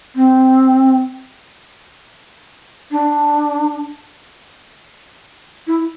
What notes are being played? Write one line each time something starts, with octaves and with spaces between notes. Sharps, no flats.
C4
D4
E4